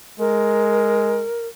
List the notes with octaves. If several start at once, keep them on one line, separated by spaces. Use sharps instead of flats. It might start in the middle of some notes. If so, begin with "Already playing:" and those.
G#3 A#4